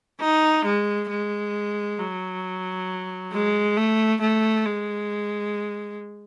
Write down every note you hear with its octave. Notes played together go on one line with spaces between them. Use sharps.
D#4
G#3
G#3
F#3
G#3
A3
A3
G#3